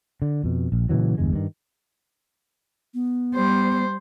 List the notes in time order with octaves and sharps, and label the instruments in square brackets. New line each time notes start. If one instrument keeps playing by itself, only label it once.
[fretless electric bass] D3
F2 B2
A#1
A#2 C#3 E3 F#3
G1 E2 G2 G#3
G2 D#3
[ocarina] B3
[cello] G3 C5